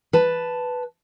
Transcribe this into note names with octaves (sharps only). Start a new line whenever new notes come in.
B4 A5